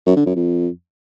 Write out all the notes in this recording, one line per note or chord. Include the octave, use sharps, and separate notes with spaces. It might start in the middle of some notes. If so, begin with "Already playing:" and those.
F#2
D3
F#2
F2